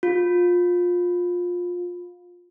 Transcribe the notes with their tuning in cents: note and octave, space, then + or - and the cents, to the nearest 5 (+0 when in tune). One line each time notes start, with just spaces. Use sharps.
F4 +20